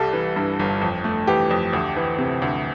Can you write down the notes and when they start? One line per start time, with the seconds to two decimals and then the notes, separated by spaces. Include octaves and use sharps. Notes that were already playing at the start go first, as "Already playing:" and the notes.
Already playing: C2 G3 A4
0.13 E3
0.36 G2
0.59 G1
0.81 F2
1.04 A3
1.27 E3 G4
1.51 F2
1.73 D2
1.96 E3
2.18 C3
2.42 D2